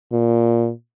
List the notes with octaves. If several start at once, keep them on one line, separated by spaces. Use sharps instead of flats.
A#2